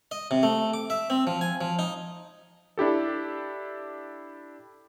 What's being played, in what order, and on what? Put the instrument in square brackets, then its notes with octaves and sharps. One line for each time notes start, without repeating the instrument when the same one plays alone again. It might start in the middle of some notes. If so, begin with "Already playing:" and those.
[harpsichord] D#5
C3
A3
D6
E5
C4
F3
G#5
F3
D#4
[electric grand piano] D4 E4 G4 A4